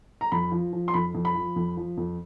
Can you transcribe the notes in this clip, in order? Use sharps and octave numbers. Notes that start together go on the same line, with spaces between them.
A#5
F2 B5
F3
F3
C6
F2 B5
F2
B5
F3
F2
F3
F2